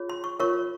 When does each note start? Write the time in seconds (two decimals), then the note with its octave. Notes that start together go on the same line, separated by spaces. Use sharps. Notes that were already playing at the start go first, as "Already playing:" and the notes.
Already playing: F4 G#4 C#5
0.09 C6
0.24 C#6
0.40 F4 A#4 C#5 C#6